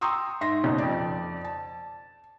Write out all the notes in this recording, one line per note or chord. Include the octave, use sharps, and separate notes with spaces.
G5 A#5 C6 C#6 D#6 E6
G#2 E5 C6 A#6
F#1 B2 C#4 D#4
F2 D5
A5